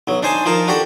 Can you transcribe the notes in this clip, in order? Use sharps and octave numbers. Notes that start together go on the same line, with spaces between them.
B1 F#3
D4 D#4 C5 G#5 A5
F3 D#4 A#4 A5
D4 F#4 G4 A4 D5